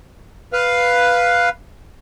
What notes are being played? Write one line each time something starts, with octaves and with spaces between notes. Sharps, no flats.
B4 F5